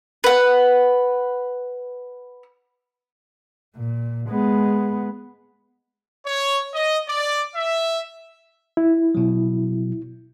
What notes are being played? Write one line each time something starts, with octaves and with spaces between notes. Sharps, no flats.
B4 F#5
A#2
G#3 B3
C#5
D#5
D5
E5
E4
B2 F#3